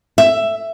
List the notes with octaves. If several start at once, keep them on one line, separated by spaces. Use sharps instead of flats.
E5